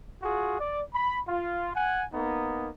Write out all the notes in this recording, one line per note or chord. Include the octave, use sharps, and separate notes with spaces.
F4 F#4 G#4
D5
B5
F4
F#5 G#5
A#3 B3 D#4